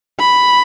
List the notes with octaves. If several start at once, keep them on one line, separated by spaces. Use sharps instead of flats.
B5